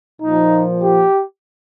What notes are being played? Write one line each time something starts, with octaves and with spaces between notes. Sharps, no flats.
A#2 F3 D#4
G4